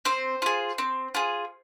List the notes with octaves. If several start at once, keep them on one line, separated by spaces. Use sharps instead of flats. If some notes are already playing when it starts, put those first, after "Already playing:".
C4 C5
F4 G#4
C4
F4 G#4